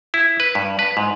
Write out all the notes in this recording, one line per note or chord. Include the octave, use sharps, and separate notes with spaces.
E4
B4
G2
B4
G#2